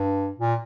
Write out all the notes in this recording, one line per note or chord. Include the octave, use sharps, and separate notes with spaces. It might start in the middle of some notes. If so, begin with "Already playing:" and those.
Already playing: G2
A#2